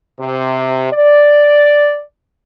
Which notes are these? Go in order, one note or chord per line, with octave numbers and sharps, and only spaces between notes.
C3
D5